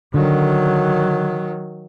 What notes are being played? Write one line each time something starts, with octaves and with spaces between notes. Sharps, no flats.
D3 D#3 F#3